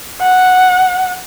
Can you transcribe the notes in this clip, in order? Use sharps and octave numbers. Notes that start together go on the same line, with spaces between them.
F#5